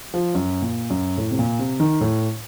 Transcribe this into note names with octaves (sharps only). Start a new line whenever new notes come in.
F3
F#2
A#2
F#2
A2
C3
A#2
C3
D#3
A2